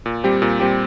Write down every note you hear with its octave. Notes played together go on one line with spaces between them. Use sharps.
A#2
G3 C4 G4
A#2
G3 C4 G4